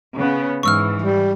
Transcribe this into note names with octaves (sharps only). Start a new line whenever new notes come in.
C#3 B3 C#4
G#2 E3 C#6 E6 F6
G3